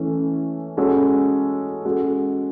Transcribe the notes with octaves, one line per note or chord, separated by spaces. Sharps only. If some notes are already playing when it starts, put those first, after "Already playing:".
Already playing: E3 A3 C#4
G#3 C#4 F#4 A4
G#3 C#4 F#4 A4